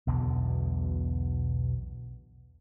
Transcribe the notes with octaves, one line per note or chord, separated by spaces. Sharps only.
B1 E2 B2 D3